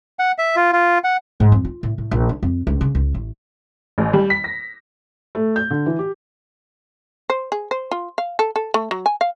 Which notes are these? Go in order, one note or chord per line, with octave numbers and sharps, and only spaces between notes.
F#5
E5
F4
F4
F#5
G#2
F2
F4
A2
A2
A#1
D4
F2
C#2
C#3
C#2
A1
A1
G3
B6
A#6
A3
G6
D3
E3
G4
C5
G#4
C5
F4
F5
A4
A4
A3
F#3
G#5
F5